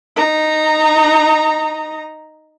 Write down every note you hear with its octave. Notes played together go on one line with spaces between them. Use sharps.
D#4 A#5